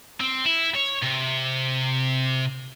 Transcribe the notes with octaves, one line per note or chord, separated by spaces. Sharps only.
C4
E4
C#5
C3